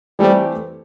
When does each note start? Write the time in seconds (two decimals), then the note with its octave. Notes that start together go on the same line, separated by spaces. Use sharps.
0.19 E3 G3 A3 C4 G4